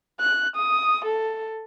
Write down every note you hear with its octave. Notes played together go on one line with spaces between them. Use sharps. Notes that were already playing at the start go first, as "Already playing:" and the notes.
F#6
D#6
A4